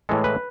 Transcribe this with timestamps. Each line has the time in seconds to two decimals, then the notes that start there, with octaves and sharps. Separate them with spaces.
0.09 A2 E3 G#3 A4
0.24 B4